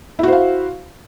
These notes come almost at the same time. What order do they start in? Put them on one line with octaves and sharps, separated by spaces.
E4 F#4 C5 F5